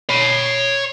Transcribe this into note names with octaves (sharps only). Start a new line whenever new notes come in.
C#5 B5